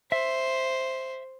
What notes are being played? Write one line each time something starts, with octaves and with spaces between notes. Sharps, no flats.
C5 E5